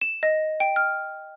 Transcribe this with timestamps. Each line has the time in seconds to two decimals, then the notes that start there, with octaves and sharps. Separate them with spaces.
0.01 E7
0.23 D#5
0.60 G5
0.76 F6